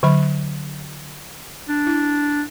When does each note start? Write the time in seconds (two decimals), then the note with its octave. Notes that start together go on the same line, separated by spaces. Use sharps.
0.03 D3 F#3 B5
1.69 D4
1.87 E4